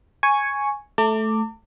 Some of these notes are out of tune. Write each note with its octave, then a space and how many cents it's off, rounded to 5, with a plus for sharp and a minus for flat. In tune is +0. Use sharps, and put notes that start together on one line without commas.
G#5 +0 C#6 +0
A3 -10 A5 +45 D6 +0